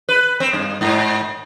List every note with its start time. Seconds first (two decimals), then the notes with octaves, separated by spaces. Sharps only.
0.09 B4
0.40 C4
0.53 G2
0.81 G#2